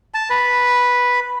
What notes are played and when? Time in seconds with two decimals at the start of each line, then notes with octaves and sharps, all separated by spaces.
0.14 A5
0.30 B4